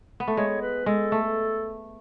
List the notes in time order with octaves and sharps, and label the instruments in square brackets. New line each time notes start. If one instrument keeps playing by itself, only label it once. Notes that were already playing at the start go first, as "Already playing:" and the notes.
[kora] B3
A3
[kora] G#3 [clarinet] C#5
[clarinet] B4
[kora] G#3 [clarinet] A4
[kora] A3